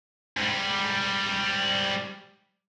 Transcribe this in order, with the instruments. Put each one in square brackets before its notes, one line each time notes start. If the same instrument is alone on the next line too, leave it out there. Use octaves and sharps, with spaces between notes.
[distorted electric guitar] G#2 G3